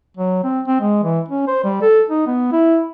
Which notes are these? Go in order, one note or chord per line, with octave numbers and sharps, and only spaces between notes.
F#3
C4
C4
G#3
E3
C#4
C5
G3
A4
D#4
B3
E4